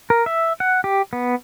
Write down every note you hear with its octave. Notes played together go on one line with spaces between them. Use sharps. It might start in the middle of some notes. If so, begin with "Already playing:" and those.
A#4
E5
F#5
G4
B3